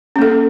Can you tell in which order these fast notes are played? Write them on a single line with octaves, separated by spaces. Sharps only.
C#4 A#3 A4